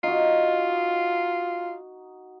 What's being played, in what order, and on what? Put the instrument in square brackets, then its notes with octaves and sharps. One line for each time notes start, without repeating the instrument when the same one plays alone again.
[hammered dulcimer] D#4 F#4 [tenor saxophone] F4